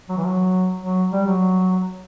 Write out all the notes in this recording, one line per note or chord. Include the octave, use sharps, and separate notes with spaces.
F#3
E3
F#3
F#3
G3
F#3